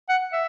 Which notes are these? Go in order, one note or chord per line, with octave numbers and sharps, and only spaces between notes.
F#5
E5